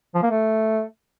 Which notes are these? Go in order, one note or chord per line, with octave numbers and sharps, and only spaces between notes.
F3
A#3
A3